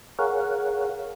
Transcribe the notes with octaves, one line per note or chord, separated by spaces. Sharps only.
G#4 A#4 C#5 F5 F#5